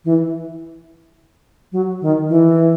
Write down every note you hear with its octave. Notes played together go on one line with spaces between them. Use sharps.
E3
F#3
D#3
E3